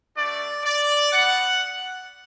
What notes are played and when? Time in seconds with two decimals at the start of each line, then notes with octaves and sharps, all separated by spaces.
0.16 A3 D4 F#4 D5
0.65 D5
1.12 B3 F#4 F#5